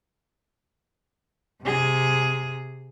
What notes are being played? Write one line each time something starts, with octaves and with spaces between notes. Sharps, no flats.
C3 G#4